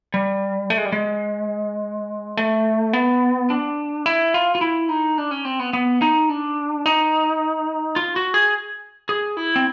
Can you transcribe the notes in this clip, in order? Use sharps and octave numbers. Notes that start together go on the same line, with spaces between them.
G3
A3
G#3
G3
G#3
A3
B3
D4
E4
F4
F4
E4
D#4
D4
C#4
C4
B3
B3
D#4
D4
D#4
F4
F#4
G#4
G#4
E4
C4